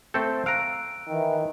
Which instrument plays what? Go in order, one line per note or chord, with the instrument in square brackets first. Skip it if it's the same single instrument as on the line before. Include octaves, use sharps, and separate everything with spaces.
[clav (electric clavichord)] A3 C4 A4 [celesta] G6
[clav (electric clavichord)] F5 A#5 [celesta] E6 F#6 D7
[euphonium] D#3 [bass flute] E3